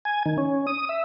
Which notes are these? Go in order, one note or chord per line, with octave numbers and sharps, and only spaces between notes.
G#5
D#3
C#4
D#6
E5